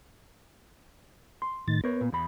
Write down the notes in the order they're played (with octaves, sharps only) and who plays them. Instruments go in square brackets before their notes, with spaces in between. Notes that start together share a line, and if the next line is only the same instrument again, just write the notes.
[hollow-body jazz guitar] C6
[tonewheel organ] A2 D#3 A6
[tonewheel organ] B3 [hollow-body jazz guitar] A#4 C#5
[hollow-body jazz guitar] A#2
E2 B5